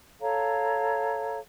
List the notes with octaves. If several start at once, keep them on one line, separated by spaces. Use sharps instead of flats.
A4 C#5 F5 A#5